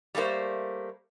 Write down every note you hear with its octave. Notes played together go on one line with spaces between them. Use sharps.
G3 A3 A#3 F#4 C5